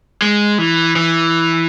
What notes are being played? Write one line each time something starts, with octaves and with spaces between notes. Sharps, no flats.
G#3
E3
E3